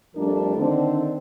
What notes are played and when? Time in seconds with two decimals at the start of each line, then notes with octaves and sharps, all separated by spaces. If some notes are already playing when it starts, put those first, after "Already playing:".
0.15 F2 F3 G3 A3 D4 A#4
0.57 D3 D#3 C4 D4